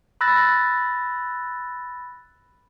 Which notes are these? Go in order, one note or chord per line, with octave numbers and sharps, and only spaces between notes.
B5 E6 F#6 A6 A#6